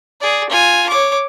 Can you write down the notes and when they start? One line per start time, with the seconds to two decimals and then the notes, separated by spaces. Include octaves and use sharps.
0.21 G#4 D5
0.50 F4 G#5
0.89 C#5 D6